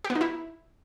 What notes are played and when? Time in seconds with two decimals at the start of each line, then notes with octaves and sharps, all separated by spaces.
0.04 G4
0.10 B3
0.15 D#4
0.21 E4